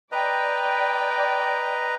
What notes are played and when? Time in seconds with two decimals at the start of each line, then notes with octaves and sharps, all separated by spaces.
0.12 B4 D5 D#5 G5 A#5